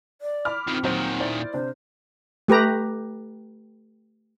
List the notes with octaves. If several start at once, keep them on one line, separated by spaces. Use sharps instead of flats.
D5
B5 D6 F6
D#3 F3 C4
A#2 D#3 F#3 C5
E4 C5 D5
C3 D4 C5
A3 G4 B4 A#5